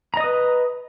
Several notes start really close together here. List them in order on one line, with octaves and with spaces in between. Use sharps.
A#5 D#5 D#6 B4